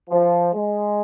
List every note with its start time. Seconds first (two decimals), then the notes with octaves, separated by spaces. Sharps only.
0.10 F3
0.55 G#3